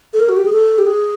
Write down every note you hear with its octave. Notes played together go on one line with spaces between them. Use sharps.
A4
A#4
F#4
G4
G#4
A4
G4
G#4